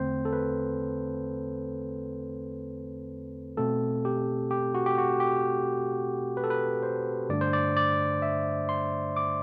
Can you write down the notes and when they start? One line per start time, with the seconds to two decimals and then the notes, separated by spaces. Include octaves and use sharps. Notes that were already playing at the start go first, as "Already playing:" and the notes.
Already playing: E2 D3 A3 C4 C5
0.25 A4
0.33 B4
3.57 B2 A3 C4 A4
4.05 G4
4.51 G4
4.74 F#4
4.86 G4
4.98 F#4
5.20 G4
6.37 B4
6.44 A4
6.50 B4
6.83 C5
7.29 G2 D3 A3 D4 D5
7.41 C5
7.53 D5
7.77 D5
8.22 E5
8.69 C6
9.17 D6